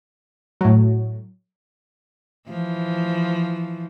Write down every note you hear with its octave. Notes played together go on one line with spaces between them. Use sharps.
A2 F#3
E3 F3